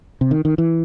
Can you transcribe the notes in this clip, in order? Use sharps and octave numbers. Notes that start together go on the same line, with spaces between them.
C3
D#3
D#3
E3